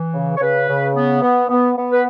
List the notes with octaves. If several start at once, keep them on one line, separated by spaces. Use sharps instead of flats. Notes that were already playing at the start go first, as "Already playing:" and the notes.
Already playing: E3
C#3
C#5
C#3 B4
C#3
B3
B3
B3
B3
B4